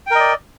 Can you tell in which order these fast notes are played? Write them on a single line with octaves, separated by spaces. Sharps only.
G5 A#4 D#5 D5